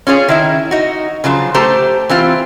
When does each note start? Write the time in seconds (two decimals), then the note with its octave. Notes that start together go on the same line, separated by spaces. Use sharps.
0.07 C#4 F4 G#4 C#5
0.28 D#3 E4 E5
0.71 D#4 F#4
1.24 C#3 F3 F#3 F4
1.54 A3 G4 C5 A5 A#5
2.09 E3 C4 F4